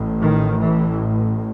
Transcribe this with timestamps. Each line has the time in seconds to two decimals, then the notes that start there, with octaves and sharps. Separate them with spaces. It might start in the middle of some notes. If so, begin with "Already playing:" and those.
Already playing: A1 A2
0.22 D#3
0.58 E3